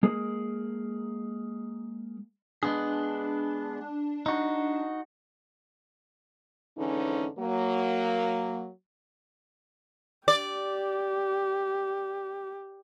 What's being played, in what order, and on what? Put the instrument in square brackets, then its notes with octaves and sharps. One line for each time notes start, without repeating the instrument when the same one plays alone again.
[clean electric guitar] G#3 A#3 G#4 A#4
[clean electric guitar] G#3 B3 G#4 [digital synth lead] D4
[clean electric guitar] D#4 F#4
[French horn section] F2 G#2 D3 E3 C#4 D#4
F#3 A#3
[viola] G4 [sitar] D5